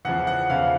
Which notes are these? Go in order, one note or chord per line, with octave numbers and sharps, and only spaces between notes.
E2 C#3 F3 F#5
F#5
E2 C#3 F3 F5